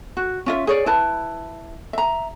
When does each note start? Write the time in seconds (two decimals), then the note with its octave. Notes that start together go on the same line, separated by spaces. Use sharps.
0.17 F#4
0.46 C#4 F4 E5
0.67 G#4 C#5 D5
0.86 E4 B4 A5
1.93 E5 A#5